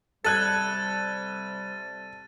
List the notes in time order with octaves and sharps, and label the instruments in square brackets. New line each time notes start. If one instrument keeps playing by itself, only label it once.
[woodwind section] C3 G3 [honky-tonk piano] A4 F#6 G#6 [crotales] A6 D#7